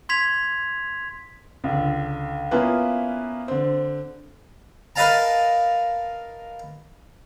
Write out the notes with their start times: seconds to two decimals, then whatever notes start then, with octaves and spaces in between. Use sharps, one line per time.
0.09 C6 G#6 B6 F7
1.64 C#2 D3
2.51 A#3 B3 C#4 E4 F4 B4
3.48 D3 C4
4.96 A#4 B4 D#5 F5 A5 A#5